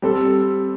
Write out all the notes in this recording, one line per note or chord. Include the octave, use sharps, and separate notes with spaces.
G3 C4 A4